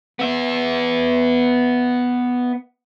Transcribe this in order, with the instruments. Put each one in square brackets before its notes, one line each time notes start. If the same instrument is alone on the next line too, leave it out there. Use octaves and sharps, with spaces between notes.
[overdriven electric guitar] B3 E5